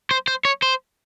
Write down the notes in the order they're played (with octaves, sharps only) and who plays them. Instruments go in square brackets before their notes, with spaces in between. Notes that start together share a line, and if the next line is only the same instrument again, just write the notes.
[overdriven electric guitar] C5
C5
C#5
C5